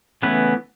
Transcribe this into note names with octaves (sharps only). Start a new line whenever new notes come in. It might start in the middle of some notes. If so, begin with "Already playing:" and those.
C#3 E3 A3 B3 C#4 B4